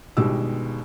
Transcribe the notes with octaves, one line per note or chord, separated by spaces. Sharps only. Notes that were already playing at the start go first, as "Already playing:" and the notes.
G1 B2 D#3 G#3 G4 E6